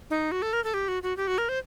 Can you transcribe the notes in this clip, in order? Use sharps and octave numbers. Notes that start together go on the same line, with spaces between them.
D#4
F#4
A4
A#4
A4
G4
F#4
F#4
G4
F#4
A#4
C5